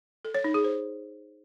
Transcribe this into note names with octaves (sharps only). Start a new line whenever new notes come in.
A4
C#5
D#4
G#4
C5